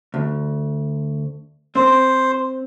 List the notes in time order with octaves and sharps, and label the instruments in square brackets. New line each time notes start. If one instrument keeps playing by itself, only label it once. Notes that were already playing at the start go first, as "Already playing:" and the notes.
[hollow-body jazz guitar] D2
[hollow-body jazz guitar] C4 [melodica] C5